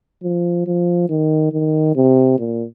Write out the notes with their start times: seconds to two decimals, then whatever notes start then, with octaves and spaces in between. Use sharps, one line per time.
0.23 F3
0.66 F3
1.09 D#3
1.52 D#3
1.95 C3
2.38 A#2